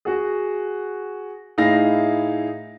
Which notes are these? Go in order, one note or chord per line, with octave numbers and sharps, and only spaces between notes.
F#4 G#4
A2 D#4 E4 G#4 F5 A#6